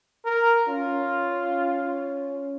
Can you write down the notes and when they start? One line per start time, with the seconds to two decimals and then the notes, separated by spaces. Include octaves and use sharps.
0.25 A#4
0.68 C#4 F4